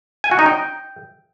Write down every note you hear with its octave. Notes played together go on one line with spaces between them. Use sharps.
G#5
F#4
D#4
G5